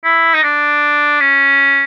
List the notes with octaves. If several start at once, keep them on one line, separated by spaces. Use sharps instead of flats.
E4
D#4
D4
C#4